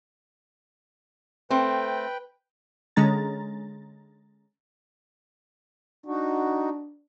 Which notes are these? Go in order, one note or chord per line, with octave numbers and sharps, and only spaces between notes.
A3 C4 B4 G5
D3 G#3 C#4 A#5 A6
D4 D#4 F#4